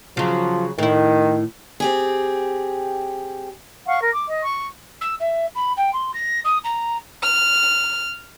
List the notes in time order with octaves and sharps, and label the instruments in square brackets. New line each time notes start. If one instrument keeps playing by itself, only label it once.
[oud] C#3 F#3 [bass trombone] F3
[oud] A2 E4 [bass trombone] D#3
[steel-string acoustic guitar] C4 G4 G#4
[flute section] F5 F#5 C#6
A#4
D6
D#5
C#6
[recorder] E6
E5
B5
G5
C6
A#6
D#6
A#5
[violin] F6